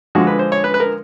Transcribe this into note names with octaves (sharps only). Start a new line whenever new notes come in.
D3 F3 G#3 F#4
B4
C5
C#5
B4
B4
A#4